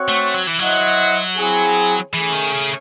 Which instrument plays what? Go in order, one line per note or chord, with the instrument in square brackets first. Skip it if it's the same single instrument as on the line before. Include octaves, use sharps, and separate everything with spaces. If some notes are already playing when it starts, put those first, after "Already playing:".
Already playing: [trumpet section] C4 F#4 C#5 F#5
[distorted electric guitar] A3
F#3
E3
[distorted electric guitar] F#3 [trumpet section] E4 C5 D#5 F#5
[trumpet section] C4 E4 G#4
[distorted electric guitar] E3 [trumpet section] A3 C#4 G#4
[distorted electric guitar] D#3
C#3